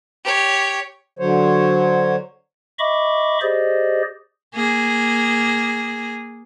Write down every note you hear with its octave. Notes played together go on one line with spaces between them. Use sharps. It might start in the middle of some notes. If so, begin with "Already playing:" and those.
G4 C#5
D3 F#3 C5 C#5
D#5 E5 B5 C#6 D6
G4 G#4 C5 D5 D#5
A#3 G#4